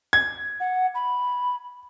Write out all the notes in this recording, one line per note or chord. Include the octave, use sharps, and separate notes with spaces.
G#6
F#5
B5